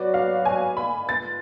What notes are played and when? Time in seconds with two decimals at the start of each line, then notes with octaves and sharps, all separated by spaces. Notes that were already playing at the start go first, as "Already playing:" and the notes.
Already playing: F#3 B3 F#4 B4 D5
0.14 F5
0.45 G#5
0.77 B5
1.09 F4 B4 A6